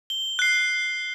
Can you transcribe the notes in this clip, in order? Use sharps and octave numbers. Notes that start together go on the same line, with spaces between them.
G7
F#6 C7